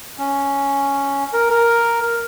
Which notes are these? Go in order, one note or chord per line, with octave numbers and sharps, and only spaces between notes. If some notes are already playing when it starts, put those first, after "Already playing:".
C#4
A#4
A#4